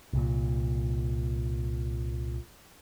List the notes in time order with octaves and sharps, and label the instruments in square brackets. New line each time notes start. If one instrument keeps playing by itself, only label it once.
[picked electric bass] C2 A#2